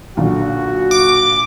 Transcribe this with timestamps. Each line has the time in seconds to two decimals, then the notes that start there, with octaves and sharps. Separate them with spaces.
0.17 B1 A#2 D3 F#4
0.91 D6